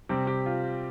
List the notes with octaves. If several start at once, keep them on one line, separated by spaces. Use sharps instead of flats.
C3 G3 C4 G4
G4
F4